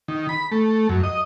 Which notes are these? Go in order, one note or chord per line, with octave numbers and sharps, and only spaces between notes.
D#3
B5
A3
F#2
D#5